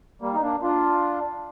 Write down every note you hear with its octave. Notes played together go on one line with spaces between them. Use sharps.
G3 A#3
D#4
A#3 D4
D4 F4